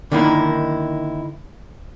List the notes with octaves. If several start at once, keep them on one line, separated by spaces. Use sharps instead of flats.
D3 D#3 A#3 D#4 E4